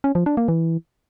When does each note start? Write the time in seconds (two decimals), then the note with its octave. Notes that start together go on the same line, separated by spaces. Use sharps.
0.04 C#4
0.15 F3
0.26 D4
0.37 A#3
0.48 E3